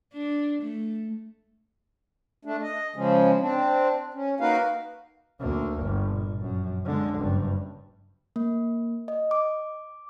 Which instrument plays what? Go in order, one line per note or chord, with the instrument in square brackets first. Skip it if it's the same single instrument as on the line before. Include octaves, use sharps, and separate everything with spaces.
[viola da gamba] D4
A3
[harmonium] A3 D4
D#5
C#3 F3 G#3 C#4
C4 D4
C#4
A#3 D#4 F#4 A#4 B4 F5
[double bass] D2 A#3
G1
A#2
A#1 F#2
D3 G#3
F#1 G2
[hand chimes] A#3
D#5
D6